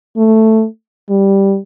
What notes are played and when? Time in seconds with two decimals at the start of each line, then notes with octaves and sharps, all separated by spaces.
0.17 A3
1.09 G3